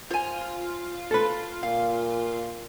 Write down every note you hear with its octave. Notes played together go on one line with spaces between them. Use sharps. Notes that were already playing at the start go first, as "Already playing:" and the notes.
F4 C5 G#5
A4 B4
A#2 F5